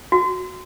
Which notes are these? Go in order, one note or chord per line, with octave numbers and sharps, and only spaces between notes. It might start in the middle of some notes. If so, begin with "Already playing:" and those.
F#4